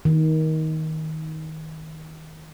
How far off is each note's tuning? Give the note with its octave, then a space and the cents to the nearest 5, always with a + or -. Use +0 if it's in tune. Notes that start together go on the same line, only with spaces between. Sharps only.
D#3 +20